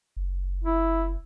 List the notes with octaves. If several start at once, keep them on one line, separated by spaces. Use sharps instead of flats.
F#1
E4